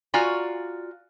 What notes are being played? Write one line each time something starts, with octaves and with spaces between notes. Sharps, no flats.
F4 F#4 D5 G#5 A#5